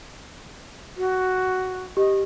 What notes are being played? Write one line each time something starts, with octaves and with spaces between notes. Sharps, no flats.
F#4
G4 D#5